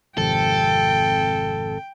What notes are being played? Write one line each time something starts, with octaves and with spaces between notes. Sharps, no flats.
G#1 F2 C3 A4 G5